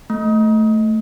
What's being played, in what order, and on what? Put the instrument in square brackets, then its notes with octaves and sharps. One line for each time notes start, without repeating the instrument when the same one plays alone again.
[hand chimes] A3